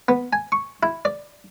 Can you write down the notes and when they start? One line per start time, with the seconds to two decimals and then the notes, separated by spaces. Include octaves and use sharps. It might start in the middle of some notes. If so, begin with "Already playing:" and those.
0.08 B3
0.33 G#5
0.52 C#6
0.83 E4
1.05 D5